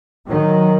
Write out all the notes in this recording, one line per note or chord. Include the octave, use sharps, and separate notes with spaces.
D#3 F#3